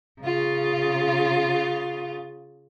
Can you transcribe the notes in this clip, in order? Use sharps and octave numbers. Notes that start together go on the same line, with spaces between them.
C#3 F4